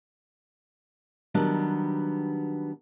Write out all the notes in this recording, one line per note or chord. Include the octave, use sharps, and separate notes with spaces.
D#3 F#3 G3 B3 D4